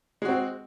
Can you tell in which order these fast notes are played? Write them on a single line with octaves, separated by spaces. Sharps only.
G#3 F#4 C4